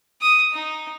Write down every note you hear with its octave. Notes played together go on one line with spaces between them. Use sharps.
D#6
D#4